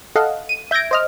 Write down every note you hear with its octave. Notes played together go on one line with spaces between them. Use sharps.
A4 D#5 F5 F#5
D#7
E5 G6 G#6 A#6 D7
C5 D#5 F6